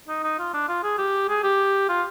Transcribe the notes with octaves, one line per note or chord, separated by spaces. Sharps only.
D#4
D#4
F4
D4
F4
G#4
G4
G#4
G4
F4